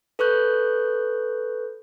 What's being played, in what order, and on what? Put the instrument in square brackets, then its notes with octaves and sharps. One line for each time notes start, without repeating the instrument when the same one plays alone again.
[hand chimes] A4 B4 C#6 F#6 G6